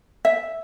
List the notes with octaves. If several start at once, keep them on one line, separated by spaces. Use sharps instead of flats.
E5